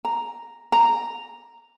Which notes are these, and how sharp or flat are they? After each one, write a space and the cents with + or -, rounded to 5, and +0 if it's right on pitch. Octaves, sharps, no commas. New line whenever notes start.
A#5 +0
A#5 -5